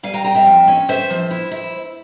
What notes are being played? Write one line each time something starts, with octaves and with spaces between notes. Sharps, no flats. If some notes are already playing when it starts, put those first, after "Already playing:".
G3 F5 G#5
G5 A#5
C4 G5 A#5
E5 G5
F3
C#4
C4 C5 E5
F3
E4
E4